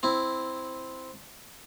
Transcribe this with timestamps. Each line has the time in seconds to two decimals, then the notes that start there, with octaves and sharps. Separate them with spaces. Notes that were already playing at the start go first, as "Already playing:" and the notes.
0.03 C4 E4